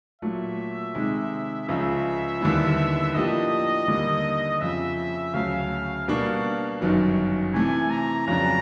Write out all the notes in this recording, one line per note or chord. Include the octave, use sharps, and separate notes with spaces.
A#2 F#3 A3 E5
C3 D#3 G#3
C#2 C#3 F3 E5
D#2 D3 G3 B3 E4
A2 F3 A#3 D4 G4 D#5
D#2 D3 G3 A#3
F2 C#3 F3 E5
D2 C#3 F#3 A3 F5
B2 G3 A#3 D4 F#4
G1 F#2 D#3 F#3
C3 E3 A3 G#5
A#5
F2 C#3 F#3 B3 D4 A#5